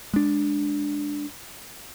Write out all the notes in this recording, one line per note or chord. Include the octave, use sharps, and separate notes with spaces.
G#3 D4